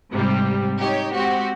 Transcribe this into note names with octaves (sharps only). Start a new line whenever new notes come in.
G#2 C3 G3
D#4 G4 C#5
G#3 C4 F#4 G4